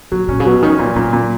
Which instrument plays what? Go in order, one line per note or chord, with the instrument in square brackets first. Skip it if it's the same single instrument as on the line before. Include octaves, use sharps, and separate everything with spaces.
[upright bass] A#2 [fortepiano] F#3
[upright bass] A#2 [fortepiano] C#4
[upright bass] C#3
[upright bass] B2 [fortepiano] F#3
[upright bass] D#3 [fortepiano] C#4
[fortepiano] A#2 [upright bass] F3
[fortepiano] A#2 [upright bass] F#3
[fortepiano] A#2